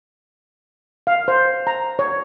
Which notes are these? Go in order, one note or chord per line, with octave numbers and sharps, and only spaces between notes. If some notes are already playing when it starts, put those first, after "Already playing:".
F5
C5
A#5
C#5